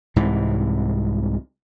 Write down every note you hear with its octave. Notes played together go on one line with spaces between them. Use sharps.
C2 G#2 C3 E3